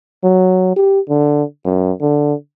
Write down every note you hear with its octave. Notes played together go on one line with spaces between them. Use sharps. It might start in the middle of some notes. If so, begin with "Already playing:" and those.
F#3
G4
D3
F#2
D3